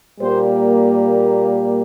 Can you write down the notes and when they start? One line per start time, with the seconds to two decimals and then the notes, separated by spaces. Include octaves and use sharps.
0.20 A#2 G3 A#3 C5